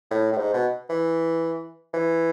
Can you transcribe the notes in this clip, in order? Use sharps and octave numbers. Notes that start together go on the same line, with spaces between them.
A2
A2
G#2
B2
E3
E3